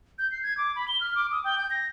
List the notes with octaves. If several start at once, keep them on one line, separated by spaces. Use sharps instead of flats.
G6
C7
G#6
D6
B5
G7
F6
D6
D#6
G5
G6
A#6